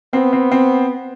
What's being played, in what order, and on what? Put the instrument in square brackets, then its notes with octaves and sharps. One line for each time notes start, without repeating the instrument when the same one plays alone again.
[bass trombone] B3 [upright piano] C4
[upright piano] C4
C4